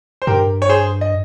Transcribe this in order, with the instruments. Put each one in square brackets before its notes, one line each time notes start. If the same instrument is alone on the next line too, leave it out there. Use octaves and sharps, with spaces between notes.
[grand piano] C5
[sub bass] G2 [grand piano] G4 A#4
[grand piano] C#5
G#4 C5
D#5